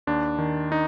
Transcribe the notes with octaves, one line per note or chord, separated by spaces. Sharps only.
D#2 D4
D#3
D#4